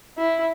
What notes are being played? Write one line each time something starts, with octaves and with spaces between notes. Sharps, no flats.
E4